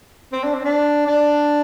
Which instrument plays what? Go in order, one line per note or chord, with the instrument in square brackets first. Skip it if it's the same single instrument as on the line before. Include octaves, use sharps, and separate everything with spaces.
[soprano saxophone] C4
D4
C4
D4
D4